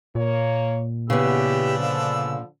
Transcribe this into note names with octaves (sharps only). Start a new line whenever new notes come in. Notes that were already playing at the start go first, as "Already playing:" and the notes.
A#2 A#3 C#5
E2 C#3 B3 D4 G4 B5 E6
D3 F3